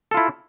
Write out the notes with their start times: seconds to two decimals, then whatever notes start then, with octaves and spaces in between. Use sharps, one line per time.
0.11 A4
0.14 F4
0.17 E4